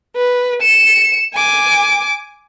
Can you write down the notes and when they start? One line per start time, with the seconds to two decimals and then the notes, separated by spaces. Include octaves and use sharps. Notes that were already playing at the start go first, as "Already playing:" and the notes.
0.16 B4
0.62 C#7 E7
1.35 G#5 D6